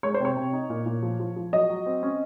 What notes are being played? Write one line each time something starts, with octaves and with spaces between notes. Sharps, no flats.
G#3 C#5
C5
C3 C#5
C3
D#4
A#2
A#2
F3
F3
F3
F#3 D#5
F#3
C4
C#4